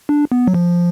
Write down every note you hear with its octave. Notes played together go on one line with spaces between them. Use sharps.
D4
B3
F#3
F3